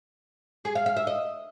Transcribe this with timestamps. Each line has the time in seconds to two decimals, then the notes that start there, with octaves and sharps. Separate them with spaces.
0.65 G#4
0.75 F5
0.86 F5
0.97 E5
1.07 D#5